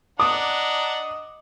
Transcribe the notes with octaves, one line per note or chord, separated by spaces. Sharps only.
D4 D#5 F#5 A#5 D6 D#6